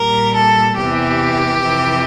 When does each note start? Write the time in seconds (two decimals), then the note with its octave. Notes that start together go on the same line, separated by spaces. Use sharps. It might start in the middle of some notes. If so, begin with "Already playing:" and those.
Already playing: A#2 G3 A#4
0.34 A4
0.76 E2 C3 E3 G4
1.61 F2 C3 E3